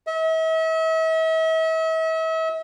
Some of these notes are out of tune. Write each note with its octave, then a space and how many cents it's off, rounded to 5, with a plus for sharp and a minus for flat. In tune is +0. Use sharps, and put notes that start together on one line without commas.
E5 -40